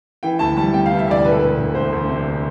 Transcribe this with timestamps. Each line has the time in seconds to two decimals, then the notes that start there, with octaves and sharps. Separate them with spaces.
0.23 E3 G5
0.39 D2 A5
0.57 G3 A5
0.73 C3 G5
0.86 F5
0.91 E3
0.99 E5
1.08 D2 D5
1.24 E1 B4
1.31 A4
1.39 E1 B4
1.58 E1
1.75 E1 C5
1.92 D2
2.09 C3